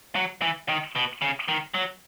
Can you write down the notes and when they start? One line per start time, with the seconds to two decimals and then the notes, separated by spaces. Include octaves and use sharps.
0.16 F#3
0.42 E3
0.69 D#3
0.96 B2
1.22 C#3
1.48 D#3
1.74 F#3